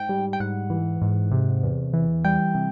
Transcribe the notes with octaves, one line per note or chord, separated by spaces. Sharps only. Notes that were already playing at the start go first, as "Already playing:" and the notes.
Already playing: G#2 G5
G3
G5
G#2 F#5
E3
G#2
C3
E2
E3
G3 G5
C3